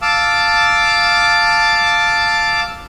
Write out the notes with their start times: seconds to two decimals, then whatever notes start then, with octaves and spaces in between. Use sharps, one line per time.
0.02 F5 A5 D6 E6